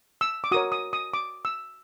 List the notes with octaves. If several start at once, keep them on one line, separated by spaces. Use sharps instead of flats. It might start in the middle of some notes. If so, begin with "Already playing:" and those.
E6
D6
F#4 A#4 C#5 D#6
D#6
D#6
D6
E6